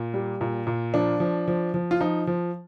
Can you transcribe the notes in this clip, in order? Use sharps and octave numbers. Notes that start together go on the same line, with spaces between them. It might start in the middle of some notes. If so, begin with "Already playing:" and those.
Already playing: A#2
G3
A#2
A#2
F3 D4
F3
F3
F3
F4
F3 D#4
F3